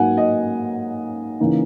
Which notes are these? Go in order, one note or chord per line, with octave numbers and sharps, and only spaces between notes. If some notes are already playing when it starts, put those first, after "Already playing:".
Already playing: G#2 F#3 A#3 F#5 G#5
D#5
C#3 E3 A#3 D#4